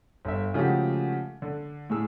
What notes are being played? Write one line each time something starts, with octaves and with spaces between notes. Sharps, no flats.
G1 E5
C#3 F3 G#3 A3 F#4 G4
D3
A2 A3 G#4 E6